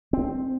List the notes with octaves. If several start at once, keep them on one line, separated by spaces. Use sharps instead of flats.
C4